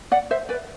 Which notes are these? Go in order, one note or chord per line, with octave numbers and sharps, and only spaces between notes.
D5 F#5
C5 E5
B4 D5